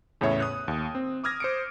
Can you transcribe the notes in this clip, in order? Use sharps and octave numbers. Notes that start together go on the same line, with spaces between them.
E2 A2 C#3 C#5 E5
D#6 F#6
D#2
C4
D6 D#6 F6 G#6 A#6
C5 C#7 D7